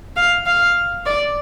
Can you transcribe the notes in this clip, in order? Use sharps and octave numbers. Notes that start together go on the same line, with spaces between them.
F5
F5
D5